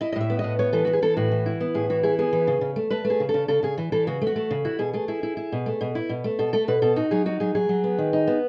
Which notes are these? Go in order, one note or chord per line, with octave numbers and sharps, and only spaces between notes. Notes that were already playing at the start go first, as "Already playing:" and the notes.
E4 D#5
D#5
A2 E5
B3
D#5
A2
B3 C#5
E3 A4
E3 F#4
G#4
E3 A4
A2 F#4
E3
E4
B3
A2 G#4
E3 F#4
E4 G#4
B3 G#4
E3
C#3
C#3
A3
A3 B4
A3
G#4
C#3
A4
C#3
C#3 A4
C#3 G#4
E3
E3 A4
C#3 F#4
A3
F#4
A3
C#3
E4 F#4
B2 G#4
A3 G#4
E4 G#4
E4
E4
B2
A3
B2
E4
B2
A3
B2 A4
A3 A4
B2 B4
B2 A4
D#4 F#4
F#3 G#4
D#4 F#4
F#3 G#4
F#3 G#4
F#3
B3
D#3
D#4
B3